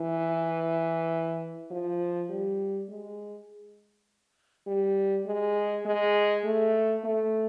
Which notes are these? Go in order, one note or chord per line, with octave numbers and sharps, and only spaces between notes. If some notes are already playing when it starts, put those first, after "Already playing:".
Already playing: E3
F3
G3
G#3
G3
G#3
G#3
A3
A3